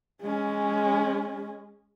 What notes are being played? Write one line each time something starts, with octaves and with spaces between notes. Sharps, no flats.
G#3 C#4